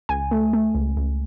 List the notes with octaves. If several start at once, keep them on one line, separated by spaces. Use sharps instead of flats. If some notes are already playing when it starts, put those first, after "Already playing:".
C#2 G#5
A3
A3
C#2
C#2